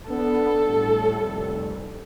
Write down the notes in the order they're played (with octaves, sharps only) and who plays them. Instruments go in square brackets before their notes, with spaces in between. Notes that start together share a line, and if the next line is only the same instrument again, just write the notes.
[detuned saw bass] B3 [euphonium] D4 [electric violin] A4
[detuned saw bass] A2 [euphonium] G3
[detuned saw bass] F1